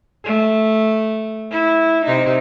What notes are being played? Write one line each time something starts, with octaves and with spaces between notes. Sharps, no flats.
A3
E4
C3 D#4